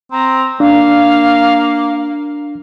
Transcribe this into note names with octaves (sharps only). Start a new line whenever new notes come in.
C4 A#5
A#3 D4 F5